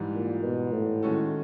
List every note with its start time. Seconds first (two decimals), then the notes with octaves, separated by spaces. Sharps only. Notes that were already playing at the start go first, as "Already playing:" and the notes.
Already playing: G#2 E3 G3
0.13 A#2
0.43 B2
0.72 A2
1.03 D#3 G#3 C#4 F#4 A4